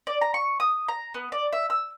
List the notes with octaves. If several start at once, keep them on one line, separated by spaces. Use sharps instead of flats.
D5
A#5
C#6
D#6
A#5
B3
D5
E5
E6